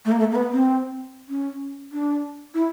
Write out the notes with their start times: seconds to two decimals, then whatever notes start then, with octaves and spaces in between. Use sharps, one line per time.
0.05 A3
0.12 A#3
0.19 A3
0.31 A#3
0.36 B3
0.52 C4
1.29 C#4
1.92 D4
2.54 E4